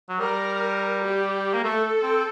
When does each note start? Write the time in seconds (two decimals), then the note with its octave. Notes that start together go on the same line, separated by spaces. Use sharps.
0.09 F#3
0.19 G3 A#4
1.06 G4
1.54 A#3
1.64 A3 A4
2.03 C4